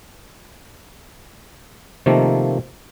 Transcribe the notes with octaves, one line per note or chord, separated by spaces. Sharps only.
C3 D#3 F3 A3 A#3